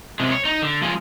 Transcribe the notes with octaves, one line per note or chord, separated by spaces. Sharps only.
C3 G#3
C#5
D#4
D3
F3 G#3